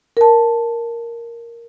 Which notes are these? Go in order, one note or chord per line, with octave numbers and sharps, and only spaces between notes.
A#4 A5